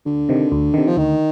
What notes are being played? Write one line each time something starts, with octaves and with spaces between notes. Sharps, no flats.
D2 D3
C3 D#3
D2
C3 D#3
F3
D2 D#3